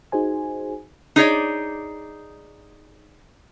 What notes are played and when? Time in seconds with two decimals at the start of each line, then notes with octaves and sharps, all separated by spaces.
0.12 D#4 F#4 G#4 C5 G#5
1.16 D#4 G#4 C#5 D5